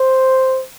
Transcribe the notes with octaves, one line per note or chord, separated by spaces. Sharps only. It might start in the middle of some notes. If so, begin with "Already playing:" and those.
Already playing: C5